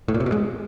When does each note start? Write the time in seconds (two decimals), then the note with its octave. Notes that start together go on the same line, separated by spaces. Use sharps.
0.08 A2
0.14 A#2
0.20 C3
0.26 B2
0.32 G#3